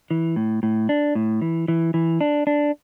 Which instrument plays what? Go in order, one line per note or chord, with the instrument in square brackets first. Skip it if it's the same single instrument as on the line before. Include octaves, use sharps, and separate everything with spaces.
[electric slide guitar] E3
A2
A2
D4
A2
E3
E3
E3
D4
D4